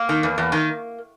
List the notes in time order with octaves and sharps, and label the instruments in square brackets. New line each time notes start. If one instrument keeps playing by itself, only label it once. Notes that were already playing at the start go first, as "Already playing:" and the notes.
Already playing: [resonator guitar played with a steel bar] A#3
D#3
E2
E2
D#3